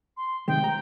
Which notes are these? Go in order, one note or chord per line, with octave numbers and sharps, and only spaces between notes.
C6
C3 D#3 G#3 G5
A#5